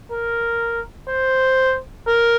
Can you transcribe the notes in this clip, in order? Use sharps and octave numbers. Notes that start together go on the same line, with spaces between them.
A#4
C5
A#4